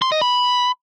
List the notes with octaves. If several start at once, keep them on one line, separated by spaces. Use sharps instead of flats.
C6
D#5
B5